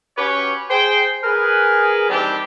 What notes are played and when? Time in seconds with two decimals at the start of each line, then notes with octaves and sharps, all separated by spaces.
0.17 C#4 F#4 G4 B4 C#5
0.70 G#4 C5 G5
1.23 G#4 A#4 B4
2.09 D#3 E3 G3 C4 D4 G4